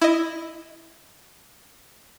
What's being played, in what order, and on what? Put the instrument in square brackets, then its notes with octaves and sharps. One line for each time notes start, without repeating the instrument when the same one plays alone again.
[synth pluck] E4 D#5